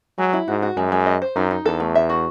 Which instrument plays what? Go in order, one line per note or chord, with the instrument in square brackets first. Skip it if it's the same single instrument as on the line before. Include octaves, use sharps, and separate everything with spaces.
[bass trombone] F#3 [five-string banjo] G#3
[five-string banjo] E4
[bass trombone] G#2 [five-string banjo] F#4
[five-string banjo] F#4
[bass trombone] F#2 [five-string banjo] G#3
[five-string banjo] G#3
D#5
C5
[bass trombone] F#2 [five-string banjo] D#4
[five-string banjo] D#4
[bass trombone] E2 [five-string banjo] A4
[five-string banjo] A3
E5
F#4